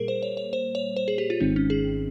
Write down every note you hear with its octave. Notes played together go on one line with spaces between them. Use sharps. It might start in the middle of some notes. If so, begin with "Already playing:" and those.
Already playing: A#2 G3 A#3 G#4 A#4
C5
C#5
C#5
C5
C#5
C5
G#4
G4
F4
G#1 G#2 D#3 G#3 C4 D#4
C#4
G#4